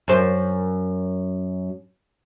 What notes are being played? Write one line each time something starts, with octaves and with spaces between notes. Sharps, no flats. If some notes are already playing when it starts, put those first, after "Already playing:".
F#2 C5